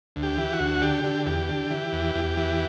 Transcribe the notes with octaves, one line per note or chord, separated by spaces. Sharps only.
D2
G4
E3
F#4
D2
D3 G4
D3
E2 G4
D3
E3
E2
E2
E3